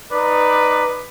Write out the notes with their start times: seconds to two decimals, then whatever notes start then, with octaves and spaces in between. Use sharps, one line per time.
0.12 D#4 B4 D5 D6